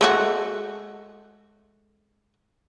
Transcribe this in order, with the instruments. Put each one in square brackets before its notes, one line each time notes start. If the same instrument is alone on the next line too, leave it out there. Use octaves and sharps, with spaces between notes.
[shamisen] G#3 A3 F#4